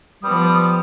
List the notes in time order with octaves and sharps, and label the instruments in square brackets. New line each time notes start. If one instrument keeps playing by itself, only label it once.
[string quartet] F3 B3 [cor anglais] G3 [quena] D#6